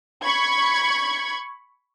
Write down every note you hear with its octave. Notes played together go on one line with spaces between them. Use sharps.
B5 C#6 G#6